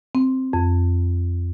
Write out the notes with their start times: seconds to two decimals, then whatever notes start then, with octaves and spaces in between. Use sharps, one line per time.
0.15 C4
0.53 F2